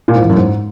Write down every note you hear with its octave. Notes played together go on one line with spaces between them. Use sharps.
A#2
G#2
E2
F#2
G#2